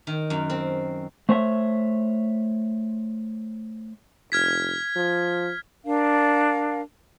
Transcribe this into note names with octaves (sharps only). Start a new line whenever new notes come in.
D#3
F#2
C4
A3 C5 C#5 E5
F1 F6 G#6 B6
F3
D4 A#4 F5